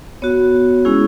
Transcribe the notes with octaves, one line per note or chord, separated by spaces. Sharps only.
B3 F#4 C#5
G#3 C#4 E4 G#4